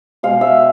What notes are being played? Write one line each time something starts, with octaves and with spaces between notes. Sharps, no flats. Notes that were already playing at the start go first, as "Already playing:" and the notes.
B2 G#3 F5
E5